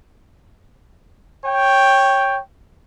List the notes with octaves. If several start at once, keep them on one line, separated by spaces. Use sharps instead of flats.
C#5 G5